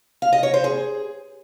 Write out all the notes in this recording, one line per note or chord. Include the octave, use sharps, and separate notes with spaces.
F5
D#5
C#5
C5
G#4